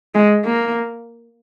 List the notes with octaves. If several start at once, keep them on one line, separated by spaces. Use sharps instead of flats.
G#3
A#3